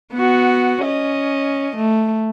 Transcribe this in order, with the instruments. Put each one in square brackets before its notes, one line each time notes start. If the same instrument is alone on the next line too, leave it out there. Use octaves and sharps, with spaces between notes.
[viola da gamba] B3 F#4
C#4 D#5
A3